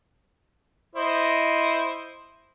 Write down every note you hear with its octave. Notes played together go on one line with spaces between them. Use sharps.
E4 C5 D#5